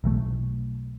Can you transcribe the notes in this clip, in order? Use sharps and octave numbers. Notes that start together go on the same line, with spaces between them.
B1 E3 A3